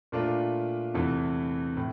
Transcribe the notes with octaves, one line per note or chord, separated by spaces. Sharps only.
A#2 A3 D4 F4 A#4
E2 C3 E3 A3
A2